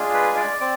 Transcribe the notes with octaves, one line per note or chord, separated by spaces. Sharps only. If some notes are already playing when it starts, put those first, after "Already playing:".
Already playing: G#3 D4 F4 G#4
B4
D5
C4 D5